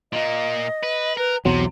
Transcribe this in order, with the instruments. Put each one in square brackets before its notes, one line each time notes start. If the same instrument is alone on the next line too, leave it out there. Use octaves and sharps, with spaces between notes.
[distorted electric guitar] A#2 A#3 [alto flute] D#5
[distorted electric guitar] B4
[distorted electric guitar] A#4 [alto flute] B4
[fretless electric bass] B1 E2 F#3 [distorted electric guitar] C3 [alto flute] C6